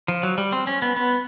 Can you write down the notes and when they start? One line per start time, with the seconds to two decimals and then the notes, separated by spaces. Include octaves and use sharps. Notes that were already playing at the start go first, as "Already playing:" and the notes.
0.08 F3
0.23 F#3
0.38 G3
0.52 C4
0.67 C#4
0.82 B3
0.96 B3